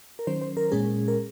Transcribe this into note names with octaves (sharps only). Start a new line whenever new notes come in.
A#4
D#3 F#3 C#4 C5
C5
A#4
A#2 G#3 C#4 G#4
A#4